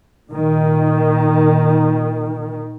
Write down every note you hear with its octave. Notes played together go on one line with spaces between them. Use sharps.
A#2 D#3